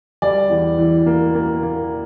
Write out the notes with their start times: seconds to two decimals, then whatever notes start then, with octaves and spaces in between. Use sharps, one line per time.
0.22 G3 D5
0.50 E2
0.78 E3
1.06 A#3
1.35 A#3
1.63 A#3